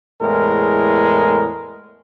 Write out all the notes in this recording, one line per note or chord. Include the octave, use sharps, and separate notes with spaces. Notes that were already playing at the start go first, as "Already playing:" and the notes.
E2 A2 G#3 A#4